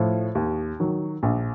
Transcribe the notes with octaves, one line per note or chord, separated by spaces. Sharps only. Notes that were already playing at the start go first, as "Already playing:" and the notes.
Already playing: A2 F3
D#2
D#3 F#3
A#1